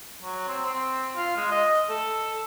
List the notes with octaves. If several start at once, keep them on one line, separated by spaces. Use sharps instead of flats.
F#3
C4
C4
F4
G#3
D#5
A4